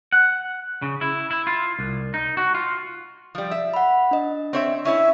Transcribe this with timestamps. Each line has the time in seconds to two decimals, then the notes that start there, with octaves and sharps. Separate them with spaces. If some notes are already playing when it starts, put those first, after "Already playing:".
0.12 F#5
0.82 C#3
1.01 E4
1.31 E4
1.47 F4
1.79 C2
2.14 D#4
2.37 F#4
2.54 F4
3.35 F3 G3
3.51 E5
3.74 F#5 B5
4.11 D4 D#5
4.53 C4 C#5 E5
4.85 C#4 E4 C#5 E5